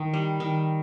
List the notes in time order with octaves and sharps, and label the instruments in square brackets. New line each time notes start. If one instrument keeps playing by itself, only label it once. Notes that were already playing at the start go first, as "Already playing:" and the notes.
Already playing: [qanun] D#3
G3
D#3